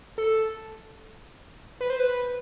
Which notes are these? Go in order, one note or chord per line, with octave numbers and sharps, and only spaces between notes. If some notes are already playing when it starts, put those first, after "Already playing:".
A4
B4
C5
B4